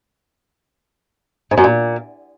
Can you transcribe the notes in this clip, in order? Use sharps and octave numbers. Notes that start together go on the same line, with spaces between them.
G#2
F#2
A#2